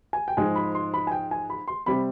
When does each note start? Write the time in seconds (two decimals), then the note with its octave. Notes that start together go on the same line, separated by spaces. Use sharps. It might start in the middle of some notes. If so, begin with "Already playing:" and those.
0.13 G#5
0.28 G5
0.37 G#2 F3 G#3 G#5
0.56 B5
0.75 C6
0.94 B5
1.07 G#5
1.12 G5
1.31 G#5
1.50 B5
1.68 C6
1.86 C3 G3 C4 B5